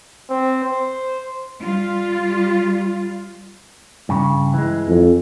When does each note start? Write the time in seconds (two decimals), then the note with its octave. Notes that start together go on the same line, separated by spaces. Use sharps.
0.30 C4
0.64 C5
1.63 G3 F4
4.09 G2 C#3
4.54 E3 G#3
4.87 F2